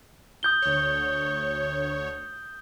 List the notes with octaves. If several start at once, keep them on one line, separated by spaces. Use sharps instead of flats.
D#6 G6 G7
D2 C#5